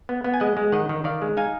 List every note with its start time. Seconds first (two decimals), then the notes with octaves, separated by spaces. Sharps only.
0.09 B3
0.24 B3
0.34 G#5
0.40 G#3 D#5 F#5
0.57 G#3
0.72 D#3 D#5 F#5
0.89 D#3
1.04 D#3 D5 F5
1.22 G#3
1.37 D#4 F5 G#5